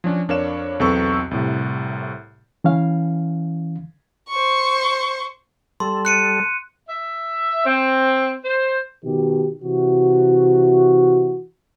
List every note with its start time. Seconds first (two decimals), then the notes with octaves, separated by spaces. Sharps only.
0.04 F3 C#4 D4
0.28 F2 D4 A#4 C#5 F5 E7
0.80 B1 E2 C4 A4 B4 C#6
1.31 C2 A2 C3
2.64 E3 C#4 F5
4.29 C5 C#6
5.80 G3 A4 C6
6.05 F#6 C#7 D#7
6.89 E5
7.65 C4
8.44 C5
9.04 B2 D#3 G4
9.62 C3 E3 F#4